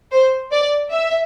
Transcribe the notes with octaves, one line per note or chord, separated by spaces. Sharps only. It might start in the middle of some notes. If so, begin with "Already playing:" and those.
C5
D5
E5